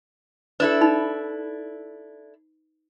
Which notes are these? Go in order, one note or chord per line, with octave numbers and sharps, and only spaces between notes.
D4 E4 A4 B4
D#4 B5